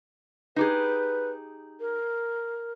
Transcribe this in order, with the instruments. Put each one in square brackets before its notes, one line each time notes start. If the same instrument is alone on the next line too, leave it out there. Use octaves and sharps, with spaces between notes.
[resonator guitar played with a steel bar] D#4 G4 G#4 [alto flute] B4
[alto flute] A#4